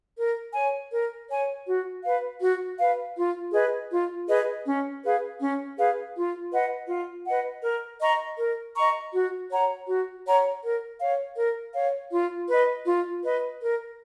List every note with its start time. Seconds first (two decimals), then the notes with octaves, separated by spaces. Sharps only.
0.17 A#4
0.54 C#5 G#5
0.92 A#4
1.29 C#5 G#5
1.66 F#4
2.04 B4 F5
2.41 F#4
2.78 B4 F5
3.16 F4
3.52 G#4 B4 D#5
3.91 F4
4.27 G#4 B4 D#5
4.65 C#4
5.03 G#4 B4 F5
5.40 C#4
5.77 G#4 B4 F5
6.15 F4
6.51 B4 D#5 F#5
6.89 F4
7.26 B4 D#5 F#5
7.63 A#4
8.01 D#5 A#5 C#6
8.38 A#4
8.76 D#5 A#5 C#6
9.12 F#4
9.50 C#5 F#5 A#5
9.87 F#4
10.25 C#5 F#5 A#5
10.62 A#4
10.99 C#5 F5
11.36 A#4
11.73 C#5 F5
12.11 F4
12.48 B4 D#5
12.85 F4
13.23 B4 D#5
13.61 A#4